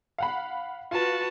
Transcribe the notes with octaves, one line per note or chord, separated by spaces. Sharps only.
F5 F#5 B5
F4 F#4 B4 A5